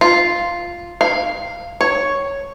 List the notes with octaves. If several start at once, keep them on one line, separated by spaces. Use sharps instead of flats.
F4
F5
C#5